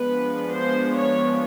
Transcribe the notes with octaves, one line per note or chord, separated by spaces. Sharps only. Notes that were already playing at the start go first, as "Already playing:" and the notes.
Already playing: F3 G#3 B3 D4 B4
C5
C#5